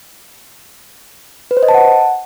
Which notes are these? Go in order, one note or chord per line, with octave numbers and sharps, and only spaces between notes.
B4
C5
D#5
A5
F#5